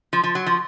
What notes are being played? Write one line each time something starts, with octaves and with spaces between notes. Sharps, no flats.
F3
F3
F#3
F3